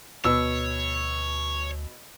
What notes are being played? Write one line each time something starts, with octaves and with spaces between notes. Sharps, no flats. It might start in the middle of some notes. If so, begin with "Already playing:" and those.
D2 B2 C#5 E6